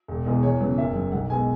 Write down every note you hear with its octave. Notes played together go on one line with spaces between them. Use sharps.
E1
E2 B2 G#3 B3
E2 C#5
C#3 F#3 B3
F#1 E5
F#2 F#3
B1 F#5
B2 G#3 B3 G#5